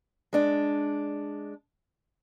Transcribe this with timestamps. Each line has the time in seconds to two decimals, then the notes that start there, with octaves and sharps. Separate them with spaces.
0.33 G#3 D4